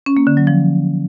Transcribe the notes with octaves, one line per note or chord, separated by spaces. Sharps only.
C#4
A#3
D3
F#3
F3